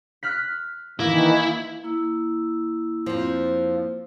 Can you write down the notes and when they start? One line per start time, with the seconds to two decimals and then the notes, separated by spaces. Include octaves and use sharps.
0.23 F6 F#6 B6
1.00 D#3 E3 A#3 E4
1.84 A#3 E4 E6
3.06 F2 F3